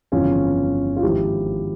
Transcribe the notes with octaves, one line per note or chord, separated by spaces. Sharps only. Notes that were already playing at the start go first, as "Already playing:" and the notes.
G1 F2 C#3 E3 C#4 F4
F4
G#1 G#2 F3 E4 G4